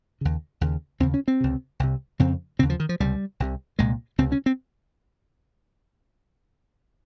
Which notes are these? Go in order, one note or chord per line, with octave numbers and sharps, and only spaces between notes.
D#2 C#3
D#2 C#3
D#2 C#3 C4
C#4
C4
C#2 C3
C2 C3
F2 C#3 C4
D#2 C#3 C4
F3
D#3
F3
C#2 C3 G3
C2 C3
C2 A#2 G#3
C#2 C3 C4
C#4
C4